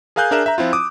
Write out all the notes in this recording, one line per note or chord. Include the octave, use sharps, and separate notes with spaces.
G#4 A#4 F5 G#5 F#6 G6
D4 G#4 A#4 E5 F#6 E7
E5 A#5
F3 C4 E4 F4
D6 D#6